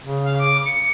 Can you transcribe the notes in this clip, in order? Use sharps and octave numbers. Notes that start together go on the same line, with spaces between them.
C#3
F5
D6
C#7